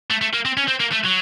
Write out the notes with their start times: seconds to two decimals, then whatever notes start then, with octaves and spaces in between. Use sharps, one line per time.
0.10 A3
0.21 A3
0.34 A#3
0.45 C4
0.57 C#4
0.68 C4
0.80 A#3
0.92 A3
1.04 F#3